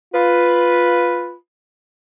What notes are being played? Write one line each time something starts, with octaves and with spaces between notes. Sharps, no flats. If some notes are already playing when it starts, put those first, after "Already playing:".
F4 B4